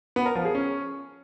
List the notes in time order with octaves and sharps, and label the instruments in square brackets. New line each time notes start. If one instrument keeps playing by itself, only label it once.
[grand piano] B3
A#4
F3
G#4
C#4